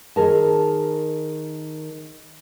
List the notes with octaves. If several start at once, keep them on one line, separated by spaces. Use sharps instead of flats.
D#3 G#4 A#4 A5